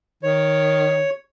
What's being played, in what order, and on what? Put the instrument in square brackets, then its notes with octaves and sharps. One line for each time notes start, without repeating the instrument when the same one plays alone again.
[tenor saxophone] D#3 [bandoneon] C#5